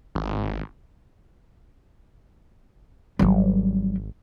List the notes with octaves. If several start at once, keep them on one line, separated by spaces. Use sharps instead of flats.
G#1
G#1 F#3 G3